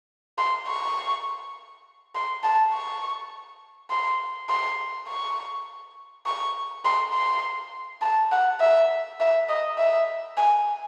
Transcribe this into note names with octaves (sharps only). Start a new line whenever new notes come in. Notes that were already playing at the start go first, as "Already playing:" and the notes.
C6
C#6
C6
A5
C#6
C6
C6
C#6
C#6
C6
C6
A5
F#5
E5
E5
D#5
E5
G#5